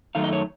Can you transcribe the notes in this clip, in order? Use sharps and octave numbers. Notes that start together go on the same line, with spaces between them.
F#2 D#3 A3 D#4 F5
D#5
C#5